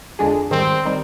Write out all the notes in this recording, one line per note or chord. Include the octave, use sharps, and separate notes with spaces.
F2 D3 G#3 D4 G#4
G#2 D#3 G3 C4
D#3 G3 C4